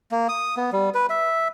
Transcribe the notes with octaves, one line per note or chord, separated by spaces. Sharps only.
A#3
D#6
B3
G3
B4
E5